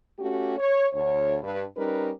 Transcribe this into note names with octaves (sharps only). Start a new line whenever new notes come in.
A3 C#4 F#4 G4
C#5
D2 C#5
G2 B4
G3 C#4 D#4 A#4 B4